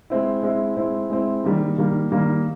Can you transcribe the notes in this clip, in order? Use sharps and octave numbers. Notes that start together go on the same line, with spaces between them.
G#3 C4 E4
G#3 C4 E4
G#3 C4 E4
G#3 C4 E4
D#3 G3 A#3
D#3 G3 A#3
D#3 G3 A#3